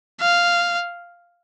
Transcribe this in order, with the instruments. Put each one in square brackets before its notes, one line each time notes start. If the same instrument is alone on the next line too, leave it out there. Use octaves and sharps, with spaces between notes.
[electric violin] F5